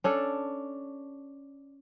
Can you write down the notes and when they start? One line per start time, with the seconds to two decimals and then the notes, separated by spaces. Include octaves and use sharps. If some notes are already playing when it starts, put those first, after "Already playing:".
0.04 C#4 D4 A4